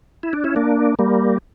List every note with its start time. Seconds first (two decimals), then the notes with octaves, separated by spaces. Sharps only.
0.23 E4
0.33 D4
0.44 C#4 E4
0.56 A#3 D4
0.99 G3 A#3